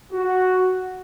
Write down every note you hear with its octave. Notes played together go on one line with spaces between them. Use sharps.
F#4